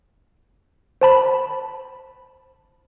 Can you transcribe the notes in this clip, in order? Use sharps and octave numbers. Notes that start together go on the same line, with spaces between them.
C5 A5 B5